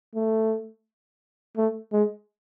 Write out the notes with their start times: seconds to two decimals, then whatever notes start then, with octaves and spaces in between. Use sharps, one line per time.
0.16 A3
1.57 A3
1.93 G#3